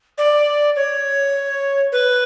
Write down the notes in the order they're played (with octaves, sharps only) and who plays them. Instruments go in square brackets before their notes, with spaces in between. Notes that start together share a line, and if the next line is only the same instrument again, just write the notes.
[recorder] D5
C#5
B4